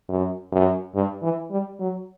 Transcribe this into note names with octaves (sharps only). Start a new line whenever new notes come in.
F#2
F#2
G2
E3
G3
F#3